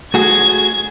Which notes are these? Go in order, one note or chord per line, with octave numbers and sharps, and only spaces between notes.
A3 F#4 G#4 G#6